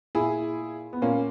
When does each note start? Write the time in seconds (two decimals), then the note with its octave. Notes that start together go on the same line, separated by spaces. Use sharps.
0.15 A#2 E4 G#4
0.93 B3
1.02 A#2 A#3 C#4